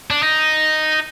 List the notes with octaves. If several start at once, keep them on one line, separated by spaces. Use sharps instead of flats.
D4
D#4